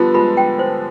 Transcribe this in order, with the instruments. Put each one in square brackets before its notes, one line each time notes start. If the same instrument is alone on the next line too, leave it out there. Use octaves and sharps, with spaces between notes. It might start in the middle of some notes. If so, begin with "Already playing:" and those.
Already playing: [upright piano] D3 F3 G3 B3 [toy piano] F4
[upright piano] F3 G#3 [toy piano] B5
[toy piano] G5
C5